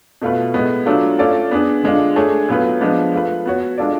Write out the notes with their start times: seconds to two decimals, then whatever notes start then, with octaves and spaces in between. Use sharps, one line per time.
0.22 B2 A3 F4 B4
0.54 A2 G#3 B3
0.86 F#3 A3 D4 F4
1.19 A3 C#4 F4 A4 D5
1.51 B3 D4 G#4
1.83 D3 G#3 D4 F4
2.16 A3 D4 G#4 C#5
2.48 A2 F#3 B3 F4 B4
2.81 F3 G#3 B3 D4
3.13 A3 F4 B4
3.46 B3 F#4 C#5
3.78 G#3 D4 F4 A4 D5